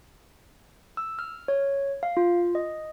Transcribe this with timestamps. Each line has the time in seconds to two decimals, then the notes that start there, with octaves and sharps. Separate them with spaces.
0.97 E6
1.19 F6
1.48 C#5
2.03 F5
2.17 F4
2.55 D#5